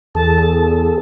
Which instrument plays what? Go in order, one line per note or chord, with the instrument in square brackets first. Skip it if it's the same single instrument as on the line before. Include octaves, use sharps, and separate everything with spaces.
[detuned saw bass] E2 [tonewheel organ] G#4 A4 [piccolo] A5